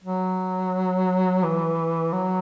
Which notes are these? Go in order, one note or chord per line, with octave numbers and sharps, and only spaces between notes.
F#3
E3
F#3